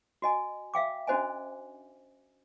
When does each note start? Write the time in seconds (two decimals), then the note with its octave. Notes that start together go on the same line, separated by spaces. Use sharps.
0.22 F#4 D#5 G#5
0.74 E5 F5 G5 D6
1.07 C#4 D4 F#4 C5 D#5 G#5